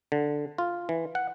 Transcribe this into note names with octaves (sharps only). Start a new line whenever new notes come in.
D3
F4
E3
F#5